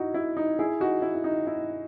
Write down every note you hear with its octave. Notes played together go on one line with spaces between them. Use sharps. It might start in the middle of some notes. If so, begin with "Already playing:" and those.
Already playing: D#4 E4 F#4
E4
D#4
E4 G#4
D#4 F#4
E4
E4
D#4
E4